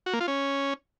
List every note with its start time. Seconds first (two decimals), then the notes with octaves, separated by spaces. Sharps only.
0.06 F#4
0.13 A#3
0.21 F4
0.28 C#4